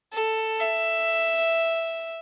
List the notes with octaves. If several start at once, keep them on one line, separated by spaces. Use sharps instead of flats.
A4
E5